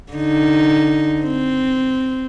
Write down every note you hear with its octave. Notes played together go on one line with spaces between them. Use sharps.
D3 D#4
C4